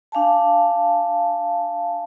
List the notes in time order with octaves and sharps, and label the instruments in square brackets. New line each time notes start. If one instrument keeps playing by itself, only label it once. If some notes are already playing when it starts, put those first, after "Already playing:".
[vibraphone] D4 F5 G#5 A5